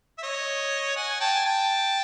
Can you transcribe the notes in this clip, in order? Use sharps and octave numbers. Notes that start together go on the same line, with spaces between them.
E5
C#5 D#5
F#5 G#5
G5 A5
G#5
G5 A5